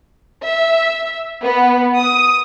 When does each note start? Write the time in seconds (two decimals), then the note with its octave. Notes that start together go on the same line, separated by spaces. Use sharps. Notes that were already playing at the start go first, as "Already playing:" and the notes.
0.44 E5
1.44 B3
2.00 D#6